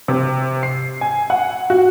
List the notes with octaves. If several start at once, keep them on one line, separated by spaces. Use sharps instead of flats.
C3
C7
G#5
F#5
F#4